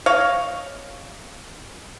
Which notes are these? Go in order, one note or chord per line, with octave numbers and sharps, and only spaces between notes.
C#5 D#5 F5